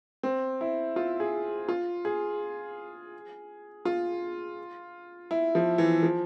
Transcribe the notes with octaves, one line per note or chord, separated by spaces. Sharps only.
C4
E4
F4
G#4
F4
G#4
F4
E4
F3
E3
F3